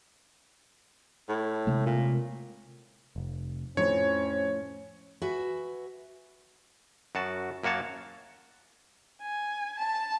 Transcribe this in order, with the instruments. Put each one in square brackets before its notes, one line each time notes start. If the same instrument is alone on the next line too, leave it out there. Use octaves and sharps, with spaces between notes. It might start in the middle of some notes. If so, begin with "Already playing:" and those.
[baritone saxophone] A2
[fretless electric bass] C3 G#3 A3
[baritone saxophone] A#2
[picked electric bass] F1
[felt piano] F2 C5 [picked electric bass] A2 [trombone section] C#4 [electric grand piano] C#5
[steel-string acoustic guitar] F#4 B4 E5 G#5
[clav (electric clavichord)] F#2 F#4 A5
F#2 A#3 F#4 C#5 A5
[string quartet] G#5
A5